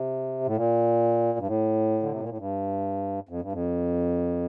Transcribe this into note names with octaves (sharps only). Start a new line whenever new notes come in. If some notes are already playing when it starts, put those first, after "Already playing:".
Already playing: C3
A2
A#2
G2
A2
D3
C3
A#2
A2
G2
F2
G2
F2